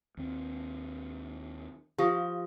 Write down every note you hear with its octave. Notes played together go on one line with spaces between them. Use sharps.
D#2 C4
F3 G4 F5 D#6 A#6